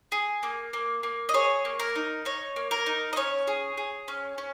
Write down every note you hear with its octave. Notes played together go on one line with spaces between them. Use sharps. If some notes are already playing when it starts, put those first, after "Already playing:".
G#4
A#3
A#3
A#3
D#5
G#4 C#5
A#3
A#4
D#4
D#4 C#5
A#3
A#4
D#4
D#5
C#4 C#5
G#4
G#4
C#4
C#4